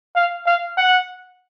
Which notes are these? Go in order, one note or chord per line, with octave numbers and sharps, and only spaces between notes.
F5
F5
F#5